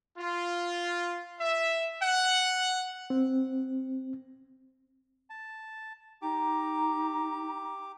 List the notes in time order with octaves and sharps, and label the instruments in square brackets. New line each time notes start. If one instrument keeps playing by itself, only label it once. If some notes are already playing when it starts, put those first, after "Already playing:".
[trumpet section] F4
E5
F#5
[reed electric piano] C4
[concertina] A5
[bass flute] D#4 [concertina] G4 D6 [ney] A#5